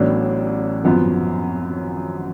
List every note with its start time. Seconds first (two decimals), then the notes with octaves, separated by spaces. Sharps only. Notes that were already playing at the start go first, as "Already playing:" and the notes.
Already playing: A1 A2 F#3 B3 D4
0.84 G#1 F#2 F3 B3